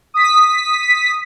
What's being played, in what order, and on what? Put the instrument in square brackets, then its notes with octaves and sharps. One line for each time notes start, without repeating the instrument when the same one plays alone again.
[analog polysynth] D#6 B6